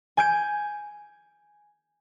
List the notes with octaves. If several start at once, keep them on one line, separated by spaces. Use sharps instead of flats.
G#5 G6 D7